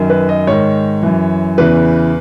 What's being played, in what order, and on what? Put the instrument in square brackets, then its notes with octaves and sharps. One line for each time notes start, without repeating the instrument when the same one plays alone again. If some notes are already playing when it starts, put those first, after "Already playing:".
Already playing: [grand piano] F#2 D#3
B4
D#5
G#2 D#3 C#5
F#2 E3
E2 C#3 E3 B4